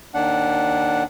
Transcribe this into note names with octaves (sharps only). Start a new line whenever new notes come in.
D#2 D4 F#5